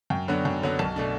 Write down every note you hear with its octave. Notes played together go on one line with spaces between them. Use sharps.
F#2 G5
D3 F#3 B3 D4
F#2
D3 F#3 B3 D4
B1 A5
B2 A3 D4